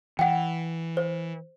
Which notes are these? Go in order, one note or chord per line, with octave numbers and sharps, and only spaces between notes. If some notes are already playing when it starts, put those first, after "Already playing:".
E3 F#5 G5
C5